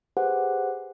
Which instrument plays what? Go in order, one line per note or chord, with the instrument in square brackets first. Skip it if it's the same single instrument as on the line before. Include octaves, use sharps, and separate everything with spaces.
[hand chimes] G4 G#4 B4 C5 F#5